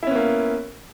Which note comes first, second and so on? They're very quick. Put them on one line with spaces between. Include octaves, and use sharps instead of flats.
E4 C#4 B3 A#3